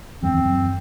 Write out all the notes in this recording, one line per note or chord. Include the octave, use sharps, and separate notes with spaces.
E2 G2 C4
E2
F#2